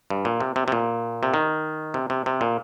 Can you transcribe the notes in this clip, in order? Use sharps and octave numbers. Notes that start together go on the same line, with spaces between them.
G2
A#2
C3
C3
C3
A#2
C3
D#3
C3
C3
C3
A#2